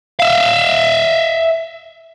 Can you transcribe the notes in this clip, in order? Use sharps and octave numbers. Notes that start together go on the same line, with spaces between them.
E5 F5